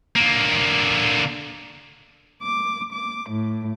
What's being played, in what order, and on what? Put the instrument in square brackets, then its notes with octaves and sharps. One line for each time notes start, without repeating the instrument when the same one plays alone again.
[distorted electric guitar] D3 A#3
[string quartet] D6
D6
A2